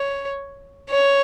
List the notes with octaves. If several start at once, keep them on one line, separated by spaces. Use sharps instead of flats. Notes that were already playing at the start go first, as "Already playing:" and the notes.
Already playing: C#5
C#5